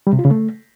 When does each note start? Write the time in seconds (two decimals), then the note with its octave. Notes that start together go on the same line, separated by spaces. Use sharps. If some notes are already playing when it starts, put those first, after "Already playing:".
0.07 G3
0.13 C3
0.19 F4
0.25 C#3
0.31 A3